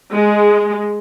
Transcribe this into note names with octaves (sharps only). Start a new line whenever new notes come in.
G#3